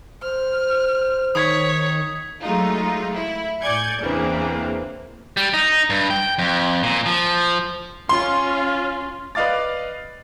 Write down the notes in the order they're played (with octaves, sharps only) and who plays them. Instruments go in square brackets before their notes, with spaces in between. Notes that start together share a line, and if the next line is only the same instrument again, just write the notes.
[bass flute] C5 [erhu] F6
[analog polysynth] D#3 [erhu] C#5 [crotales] D#6 G#6 B6
[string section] F#3 G#3 A3 D#4 F4
E4
A2 D5 G#5 G6 G#6 C#7
E2 C#3 E3 A#3 C4 D4
[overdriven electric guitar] G3
D#4
G2
G5
F2
A#2
F3
[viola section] C#4 F4 [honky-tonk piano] C6
[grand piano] B4 D5 D#5 F5 D6 A6